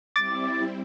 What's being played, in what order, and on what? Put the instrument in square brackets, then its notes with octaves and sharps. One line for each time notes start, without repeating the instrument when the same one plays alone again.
[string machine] G3 C4 E4 [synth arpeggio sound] D6 [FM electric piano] A6